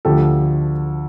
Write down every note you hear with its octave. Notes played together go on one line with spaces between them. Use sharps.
D2 D3 F3 G4 A4